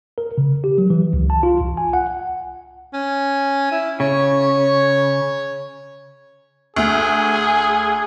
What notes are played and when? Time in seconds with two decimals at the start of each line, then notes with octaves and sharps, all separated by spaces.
0.18 A#4
0.38 C#3
0.64 G4
0.78 F#3
0.90 E3
1.13 C#2
1.30 A5
1.43 F4
1.61 C2
1.77 G#5
1.93 F#5
2.93 C#4
3.71 E4
4.00 C#3 C#5
6.76 D2 G#4